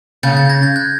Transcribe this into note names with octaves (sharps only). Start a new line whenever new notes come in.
C#3 G6 A6
G6 A6
G#6 A#6
G6 A6
F#6 G#6